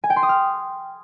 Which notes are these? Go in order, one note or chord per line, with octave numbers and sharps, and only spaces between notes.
G#5
G5
C6
D#6
F6